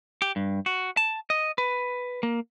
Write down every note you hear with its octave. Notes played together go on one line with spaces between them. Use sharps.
G4
G2
F#4
A5
D#5
B4
A#3